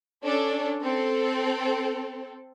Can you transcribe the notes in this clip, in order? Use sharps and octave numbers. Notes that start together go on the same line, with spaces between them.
C#4 D4 A4
C4 A4